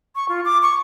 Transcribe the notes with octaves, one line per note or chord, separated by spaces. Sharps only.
C#6
F4
D6
C#6